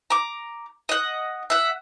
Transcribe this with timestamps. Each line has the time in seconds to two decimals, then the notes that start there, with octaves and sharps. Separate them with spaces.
0.10 A#5 D6
0.89 D#5 F#5
1.50 E5 F#5